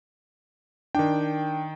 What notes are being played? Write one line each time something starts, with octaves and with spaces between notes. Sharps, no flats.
D#3 D4 G5